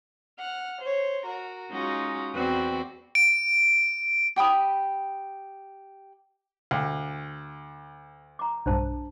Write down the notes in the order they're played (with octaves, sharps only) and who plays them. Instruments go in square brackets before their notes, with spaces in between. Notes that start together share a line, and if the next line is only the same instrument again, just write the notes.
[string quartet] F#5 F6
C5 C#5
F#4 A#4
G#3 C#4 D#4 F4 F#4
E2 C4 F#4 B4 D5 G5
[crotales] D7
[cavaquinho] G4 G5 B5 D#6
[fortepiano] D2 [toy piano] G#4 F5 G5
[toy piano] A#5 D6
[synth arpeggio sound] B1 G2 [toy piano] D4 C5 A5